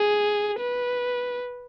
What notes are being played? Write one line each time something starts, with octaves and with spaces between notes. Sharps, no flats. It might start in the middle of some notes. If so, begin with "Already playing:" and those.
Already playing: G#4
B4